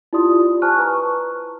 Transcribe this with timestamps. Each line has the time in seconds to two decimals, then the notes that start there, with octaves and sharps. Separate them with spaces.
0.13 E4 F4 G4 D5 C6 D#6
0.62 C5 G#5 A5 C#6 F6 F#6
0.78 B4 A#5 C#6